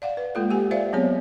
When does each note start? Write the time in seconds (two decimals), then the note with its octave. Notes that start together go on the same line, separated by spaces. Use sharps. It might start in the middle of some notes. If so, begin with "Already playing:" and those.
0.02 D5 F5 F#5
0.17 B4
0.35 G#3 A#3 F4 A4
0.50 G4 F#5 G#5
0.71 C5 D5 E5 F5
0.93 F#3 B3 C4 G#4 C#5